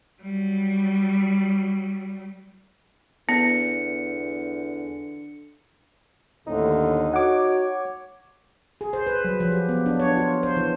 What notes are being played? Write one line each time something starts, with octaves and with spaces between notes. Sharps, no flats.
F#3 G3
E2 D3 B3 C#7
D#2 A2 D3 C4 D#4
F#4 C#5 F#5 D6
G#4
C5
B4
F#3
F3
G4
B3
D4
C#5
F4
C5
E3